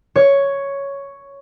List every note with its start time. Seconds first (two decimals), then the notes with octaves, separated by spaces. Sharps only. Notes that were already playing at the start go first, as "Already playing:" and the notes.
0.16 C#5